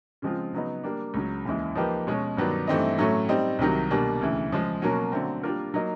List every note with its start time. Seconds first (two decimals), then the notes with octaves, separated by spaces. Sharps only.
0.22 C#3 F3 G#3 C4 F4
0.53 C#3 F#3 B3 D#4
0.83 G3 A#3 D4
1.14 C#2 C#3 F#3
1.45 D#2 C#3 E3 G#3
1.75 F3 A#3 D#4 G4 B4
2.07 B2 G#3 C#4
2.37 G2 D#3 F#3 B3 D4
2.67 G2 E3 A3 C4 D#4
2.98 A2 F#3 A3 C#4
3.29 G3 C4 D#4
3.59 C2 C3 D#3 F#3
3.90 B2 G3 A#3 D4
4.21 D2 C#3 E3
4.51 C#3 F3 G#3
4.82 B2 F#3 A#3 C#4 F#4
5.12 D3 F#3 A3 C4
5.43 G3 A#3 D4 F4 A#4
5.74 F#3 A#3 D#4